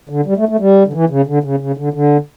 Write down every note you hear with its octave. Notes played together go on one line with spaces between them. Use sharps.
D3
G3
A3
A3
G3
D3
E3
C#3
D3
C#3
C#3
D3
D3